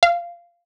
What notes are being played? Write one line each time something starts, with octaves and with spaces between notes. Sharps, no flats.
F5